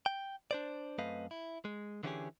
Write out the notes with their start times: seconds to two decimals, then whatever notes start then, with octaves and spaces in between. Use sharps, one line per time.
0.06 G5
0.51 D4 C5 D5
0.98 F#2 A3 C4 B4 D#5 F5
1.31 E4
1.65 G#3
2.03 D3 E3 B3 C#4 G4 G#4